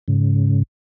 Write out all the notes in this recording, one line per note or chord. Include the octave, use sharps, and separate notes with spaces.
G#2 C#3